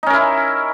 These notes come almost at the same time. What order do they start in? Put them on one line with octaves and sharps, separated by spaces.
D#4 C#4 A#4 E4